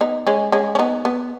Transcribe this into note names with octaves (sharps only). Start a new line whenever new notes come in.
B3 D#4
G#3 C#4
G#3 C#4
C#4
B3 D#4
B3